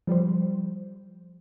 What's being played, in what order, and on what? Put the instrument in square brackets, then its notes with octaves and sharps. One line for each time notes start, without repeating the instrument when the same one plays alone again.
[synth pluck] F3 G3 G4 C5